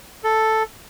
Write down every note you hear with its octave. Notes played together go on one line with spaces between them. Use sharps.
A4